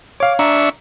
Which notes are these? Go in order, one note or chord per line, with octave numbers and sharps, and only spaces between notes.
C#5 F5 D6
D4 E5 A#5 C#6